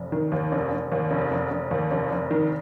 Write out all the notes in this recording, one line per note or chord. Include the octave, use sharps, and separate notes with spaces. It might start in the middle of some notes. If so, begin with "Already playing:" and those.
Already playing: F1
D#3
D#2
F1
F1
D#2
F1
F1
F1
D#2
F1
F1
D#3